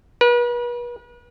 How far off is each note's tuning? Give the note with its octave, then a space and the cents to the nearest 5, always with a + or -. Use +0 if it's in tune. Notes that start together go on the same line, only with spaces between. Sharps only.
B4 -40